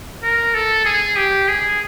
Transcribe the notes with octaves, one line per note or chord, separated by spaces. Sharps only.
A#4
A4
G#4
G4
G#4